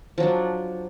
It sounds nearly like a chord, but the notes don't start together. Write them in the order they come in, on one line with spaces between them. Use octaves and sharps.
F3 F#3 D4